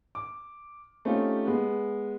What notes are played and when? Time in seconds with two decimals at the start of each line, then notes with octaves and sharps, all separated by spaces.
0.15 D6
1.05 A3 C4 C#4 D#4 F4 G4
1.46 G#3 B3